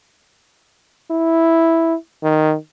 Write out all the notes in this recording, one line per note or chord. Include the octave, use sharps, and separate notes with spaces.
E4
D#3